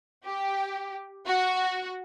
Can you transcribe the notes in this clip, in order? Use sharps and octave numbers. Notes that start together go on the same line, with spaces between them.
G4
F#4